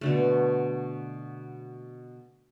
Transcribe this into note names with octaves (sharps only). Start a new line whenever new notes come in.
B2 D3 A3